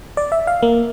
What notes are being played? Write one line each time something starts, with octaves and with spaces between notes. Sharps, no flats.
D5
E5
F5
A#3